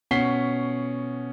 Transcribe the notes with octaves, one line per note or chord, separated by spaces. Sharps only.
B2 C#4 F#5 B6 C7 G7